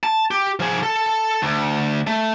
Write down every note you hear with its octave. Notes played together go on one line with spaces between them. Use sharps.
A5
G4
F3 G#4
A4
D2
A3